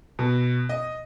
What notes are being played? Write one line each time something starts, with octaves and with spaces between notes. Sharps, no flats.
B2
D#5